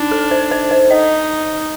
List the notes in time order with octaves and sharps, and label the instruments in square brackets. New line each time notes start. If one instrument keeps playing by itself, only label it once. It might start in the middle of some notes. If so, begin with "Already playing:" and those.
Already playing: [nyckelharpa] D4 [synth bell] D#4
[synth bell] A4
C5
C5
C5
[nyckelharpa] D#4 [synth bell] D#5